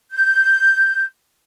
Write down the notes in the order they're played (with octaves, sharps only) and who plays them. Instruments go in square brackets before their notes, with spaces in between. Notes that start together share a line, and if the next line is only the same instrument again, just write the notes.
[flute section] G6